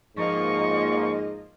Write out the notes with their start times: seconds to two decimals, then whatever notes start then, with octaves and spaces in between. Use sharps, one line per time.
0.17 G#2 F3 A#3 F4 D#5 C#6